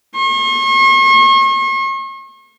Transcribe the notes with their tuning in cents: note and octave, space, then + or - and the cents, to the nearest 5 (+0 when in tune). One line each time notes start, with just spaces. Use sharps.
C#6 -45